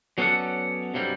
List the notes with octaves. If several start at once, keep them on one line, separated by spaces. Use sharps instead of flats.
F#3 B3 C#4 A4 D5 F#5
G2 C3 F#3 G3